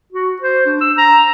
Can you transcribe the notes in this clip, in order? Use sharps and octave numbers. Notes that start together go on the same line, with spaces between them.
F#4
C5
D4
E6
A#5